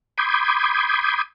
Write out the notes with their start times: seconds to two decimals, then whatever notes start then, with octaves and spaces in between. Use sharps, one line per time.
0.18 B5 C6 D6 D#6 G6 G#6